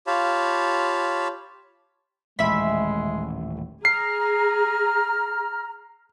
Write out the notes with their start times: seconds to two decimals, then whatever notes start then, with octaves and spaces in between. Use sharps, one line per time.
0.07 F4 G4 C#5 F5 A5 B5
2.39 D#1 A1 D#2 G#3 E5 B5
3.85 G#4 A#5 F6 C7